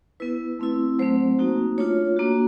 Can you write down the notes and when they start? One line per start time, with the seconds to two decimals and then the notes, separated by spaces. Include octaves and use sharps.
0.20 B3 E4 B4
0.59 A3 C4 E4
0.99 F#3 A3 C4 C5
1.39 A#3 D#4 F#4
1.77 A3 D4 F4 C#5
2.17 A#3 D4 F#4